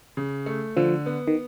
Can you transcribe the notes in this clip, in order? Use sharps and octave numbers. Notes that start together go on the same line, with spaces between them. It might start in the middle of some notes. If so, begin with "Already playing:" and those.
C#3
A3
D3 F3
B3
D#3